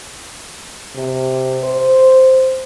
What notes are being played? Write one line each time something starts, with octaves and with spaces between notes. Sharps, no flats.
C3
C5